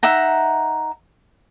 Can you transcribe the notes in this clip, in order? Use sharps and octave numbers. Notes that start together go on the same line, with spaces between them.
D#4 E5 F#5 A#5